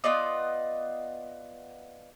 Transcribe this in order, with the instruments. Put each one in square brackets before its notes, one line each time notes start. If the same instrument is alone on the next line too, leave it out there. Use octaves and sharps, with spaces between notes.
[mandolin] B3 F4 D5 D#5